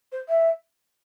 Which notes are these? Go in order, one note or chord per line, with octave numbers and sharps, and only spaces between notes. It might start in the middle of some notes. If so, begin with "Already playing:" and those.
C5
E5